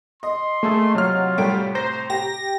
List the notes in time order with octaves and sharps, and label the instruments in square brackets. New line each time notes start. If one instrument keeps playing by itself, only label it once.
[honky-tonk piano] D#5 [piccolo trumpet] C6
[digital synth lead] A3 [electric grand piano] A#3 G#4 A4
[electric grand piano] C3 F6 [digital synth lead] F#3 [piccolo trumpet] F4
[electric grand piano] A2 C3 D7 [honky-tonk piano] G3 A3 G4
[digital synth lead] C5 [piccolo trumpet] A#5 [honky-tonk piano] A#6
[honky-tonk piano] G4 [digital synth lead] A#6